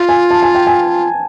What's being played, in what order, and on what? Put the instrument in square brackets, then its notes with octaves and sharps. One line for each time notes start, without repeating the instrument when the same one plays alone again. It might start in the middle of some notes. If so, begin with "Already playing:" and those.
Already playing: [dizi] F4
[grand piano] G#5
A5
G#5
G5
G#5